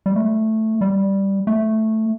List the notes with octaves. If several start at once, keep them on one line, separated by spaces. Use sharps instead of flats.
G3
A3
G3
A3